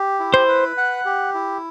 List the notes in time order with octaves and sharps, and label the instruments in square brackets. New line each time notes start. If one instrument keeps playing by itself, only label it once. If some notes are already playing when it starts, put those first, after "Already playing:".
Already playing: [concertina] G4
E4
[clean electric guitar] C5
[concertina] B4
F#5
G4
E4